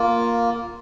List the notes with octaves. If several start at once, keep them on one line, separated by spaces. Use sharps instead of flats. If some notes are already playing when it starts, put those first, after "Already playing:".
Already playing: A#3 F4